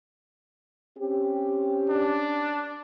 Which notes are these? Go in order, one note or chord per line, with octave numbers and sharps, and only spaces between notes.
C4 C#4 G4
D4